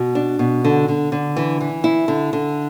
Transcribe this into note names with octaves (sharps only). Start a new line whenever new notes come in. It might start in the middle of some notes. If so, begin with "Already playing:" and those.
Already playing: B2
D4
B2
D3
D3
D3
E3
E3
E4
D3
D3